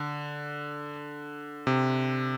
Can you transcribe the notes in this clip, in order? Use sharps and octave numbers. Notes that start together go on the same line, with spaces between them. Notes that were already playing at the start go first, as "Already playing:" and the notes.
Already playing: D3
C3